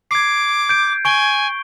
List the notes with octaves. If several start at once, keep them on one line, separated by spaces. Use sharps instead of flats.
D6 G#6 C7
G6 D7
G#5 C#6 D7 G7